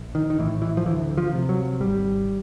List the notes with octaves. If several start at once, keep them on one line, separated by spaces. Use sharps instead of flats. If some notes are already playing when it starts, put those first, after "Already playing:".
Already playing: A#1
D#3
D#3
A2 E3
E3
F3
D2 E3
F3
C3
F#3
G#1 G3